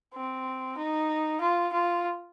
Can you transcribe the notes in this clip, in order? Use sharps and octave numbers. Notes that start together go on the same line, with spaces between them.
C4
D#4
F4
F4